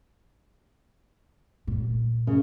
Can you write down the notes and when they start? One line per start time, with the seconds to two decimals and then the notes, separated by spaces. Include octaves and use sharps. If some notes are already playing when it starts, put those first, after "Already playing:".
1.67 A#2
2.27 C#3